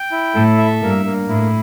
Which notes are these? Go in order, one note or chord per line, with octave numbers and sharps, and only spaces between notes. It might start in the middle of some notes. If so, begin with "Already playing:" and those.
Already playing: G5
E4
A2 A4
E5
G2 A#3
A#3
A2 E4